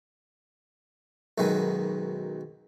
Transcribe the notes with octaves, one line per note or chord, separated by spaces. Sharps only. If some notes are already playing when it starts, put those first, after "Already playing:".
B1 F#2 B2 D#3 G#3 B3